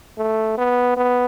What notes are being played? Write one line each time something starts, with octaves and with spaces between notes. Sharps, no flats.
A3
B3
B3